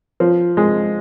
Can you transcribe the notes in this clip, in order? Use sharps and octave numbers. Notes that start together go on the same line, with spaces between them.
F3
G#3